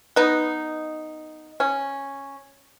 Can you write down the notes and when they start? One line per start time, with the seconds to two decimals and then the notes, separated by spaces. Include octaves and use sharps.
0.16 B3 D#4
1.60 C#4